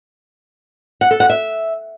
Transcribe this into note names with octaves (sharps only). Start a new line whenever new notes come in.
F#5
A4
F#5
E5